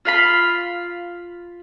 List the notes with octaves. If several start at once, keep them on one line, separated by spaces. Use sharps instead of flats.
F4 F5 B5